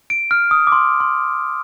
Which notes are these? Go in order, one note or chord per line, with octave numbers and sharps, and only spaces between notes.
D7
F6
D#6
D6
C6
C6